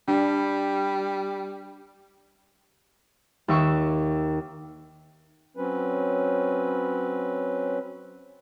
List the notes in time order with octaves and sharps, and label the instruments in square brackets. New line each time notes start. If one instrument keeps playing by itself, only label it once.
[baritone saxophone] G3 [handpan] D4
[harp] D#2 E5 C#6
[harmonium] F#3 C4 C#4 B4